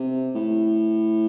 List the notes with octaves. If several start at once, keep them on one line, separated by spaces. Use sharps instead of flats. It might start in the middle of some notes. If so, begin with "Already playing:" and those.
Already playing: C3
A2